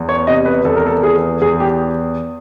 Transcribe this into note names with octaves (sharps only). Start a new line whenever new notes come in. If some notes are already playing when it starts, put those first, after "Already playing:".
Already playing: E2
C#5
C3 D#5
B4
E2 A4
A#4
A4
E3 G#4
E2 G#4
G4